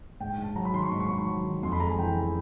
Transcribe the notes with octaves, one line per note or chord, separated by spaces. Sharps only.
G#2 G5
G#2
A5
F#3 A#5
B5
D#3 C6
C#6
G#2 C6
C#6
G#2 C6
C#6
F#3
D#3
F2 C6
B5
G#3 A#5
G#5
E3 G5
C#3